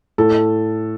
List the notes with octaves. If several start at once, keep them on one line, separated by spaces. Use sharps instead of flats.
A2 A4